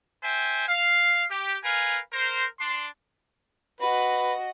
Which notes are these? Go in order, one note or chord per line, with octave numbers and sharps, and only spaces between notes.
C5 E5 G5 G#5
F5
G4
A#4 B4 F5 G#5
A#4 C5
D4 C6
F#4 B4 D#5